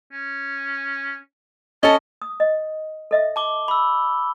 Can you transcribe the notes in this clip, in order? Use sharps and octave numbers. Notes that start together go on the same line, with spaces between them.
C#4
C#4 A4 D#5 A5
D#6
D#5
A4 D#5 E5
A5 D6 G7
B5 E6